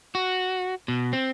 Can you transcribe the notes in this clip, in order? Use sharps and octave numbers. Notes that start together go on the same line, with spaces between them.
F#4
B2
C4